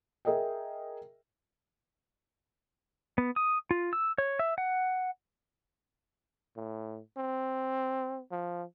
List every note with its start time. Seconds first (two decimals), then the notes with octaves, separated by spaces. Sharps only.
0.25 G#4 A#4 D#5 E5 G5
3.18 B3
3.36 D#6
3.71 F4
3.93 E6
4.18 C#5
4.39 E5
4.58 F#5
6.56 A2
7.17 C4
8.31 F3